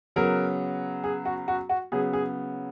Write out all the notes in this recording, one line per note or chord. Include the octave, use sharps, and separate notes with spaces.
C#3 F#3 B3 A#4
G#4
F#4
F#4
F#4
C#3 F#3 B3 G#4
G#4